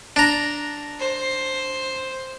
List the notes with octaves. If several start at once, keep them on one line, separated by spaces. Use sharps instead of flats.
D4 A#5
C5